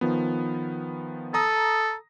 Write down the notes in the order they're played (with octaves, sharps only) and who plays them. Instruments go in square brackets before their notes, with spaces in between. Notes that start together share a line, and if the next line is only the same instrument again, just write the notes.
[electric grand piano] D#3 F3 B3
[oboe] A4 [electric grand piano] A#5 D#6 A#6